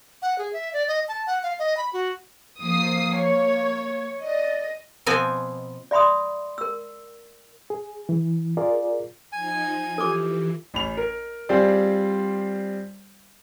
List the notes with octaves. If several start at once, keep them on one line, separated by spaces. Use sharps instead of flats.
F#5
G#4
E5
D5
D#5
A5
F#5
F5
D#5
B5
F#4
F3 A#3 D#6 C7
C#5
D5 D#5
B2 F3 B3 C4 G#5
D5 E5 B5 C6 D#6
A#4 E6
G#4
E3
F4 G#4 A#4 D5
F3 D#4 G#5
E3 F4 G4 A4 D6
A1 B5 F7
A#4
G3 C4 F4 G#4 C5 D5